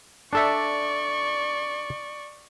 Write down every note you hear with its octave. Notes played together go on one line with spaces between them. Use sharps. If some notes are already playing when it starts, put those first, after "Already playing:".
D4 A4 D5 E5 C#6